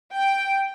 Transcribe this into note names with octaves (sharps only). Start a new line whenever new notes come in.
G5